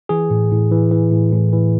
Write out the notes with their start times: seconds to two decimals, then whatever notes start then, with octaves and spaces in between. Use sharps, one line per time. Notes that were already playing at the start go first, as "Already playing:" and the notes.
0.09 E3 G#4
0.30 A2
0.51 A2
0.72 E3
0.92 E3
1.12 A2
1.32 A2
1.53 E3